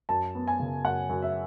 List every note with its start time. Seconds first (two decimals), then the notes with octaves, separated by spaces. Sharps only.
0.09 F#2 A5
0.35 B3
0.48 G#5
0.59 C#3
0.84 F#2 F#5
1.09 F#2
1.22 E5